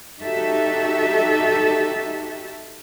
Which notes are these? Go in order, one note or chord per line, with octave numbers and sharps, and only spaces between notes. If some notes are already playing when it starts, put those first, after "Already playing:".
D#4 F#4 G4 A4 E5